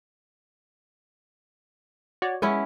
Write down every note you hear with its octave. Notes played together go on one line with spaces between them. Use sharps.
F#4 C#5 D5
G#3 B3 C#4 E4